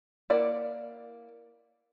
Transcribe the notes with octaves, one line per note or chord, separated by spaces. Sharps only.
A#3 E4 D5 F#5